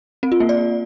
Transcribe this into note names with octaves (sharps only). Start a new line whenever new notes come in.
C4
F4
A#3
D5